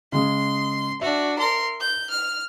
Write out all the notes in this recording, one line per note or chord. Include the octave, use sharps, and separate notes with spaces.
C#3 G#3 C6
D4 F#4 E5
A#4 C6
G6
F6